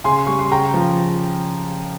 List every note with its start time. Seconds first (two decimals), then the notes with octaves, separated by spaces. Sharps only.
0.04 C#3 G#5 C6
0.27 G3 C#6
0.39 C6
0.51 C#3 G5 A#5
0.74 F3